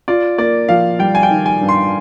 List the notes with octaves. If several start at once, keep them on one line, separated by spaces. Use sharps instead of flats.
F4 D5
A#3 D5
F3 F5
G3 G5
G#5
G5
D#3
G#5
G2
C6